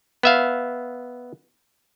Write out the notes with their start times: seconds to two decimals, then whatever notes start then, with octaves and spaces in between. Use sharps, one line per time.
0.23 B3 E5 F5